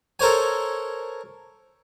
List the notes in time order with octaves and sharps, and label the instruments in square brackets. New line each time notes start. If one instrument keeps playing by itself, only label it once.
[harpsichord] A4 A#4 C5 C#5 G#5